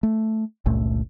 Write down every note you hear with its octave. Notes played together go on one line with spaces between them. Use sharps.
A3
G1 C#2 A#2 A3